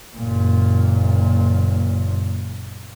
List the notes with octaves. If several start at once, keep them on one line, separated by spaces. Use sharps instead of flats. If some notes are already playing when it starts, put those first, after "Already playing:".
F#1 A#2